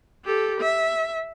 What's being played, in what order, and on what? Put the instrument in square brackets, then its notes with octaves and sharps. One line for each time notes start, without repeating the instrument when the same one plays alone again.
[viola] G4 A4
E5